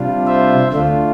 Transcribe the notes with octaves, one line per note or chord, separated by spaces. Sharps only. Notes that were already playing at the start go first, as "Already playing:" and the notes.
Already playing: C3 G3 D4 F4
C5 E5
D2 D3 A3 D4 F4